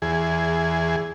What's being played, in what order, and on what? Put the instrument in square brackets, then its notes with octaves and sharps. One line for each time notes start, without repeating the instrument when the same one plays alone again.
[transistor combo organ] E2 G#4